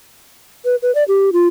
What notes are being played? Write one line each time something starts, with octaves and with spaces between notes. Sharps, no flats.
B4
B4
D5
G4
F4